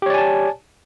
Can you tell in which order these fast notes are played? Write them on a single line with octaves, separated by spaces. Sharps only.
G4 C#5 D5 G#5 A5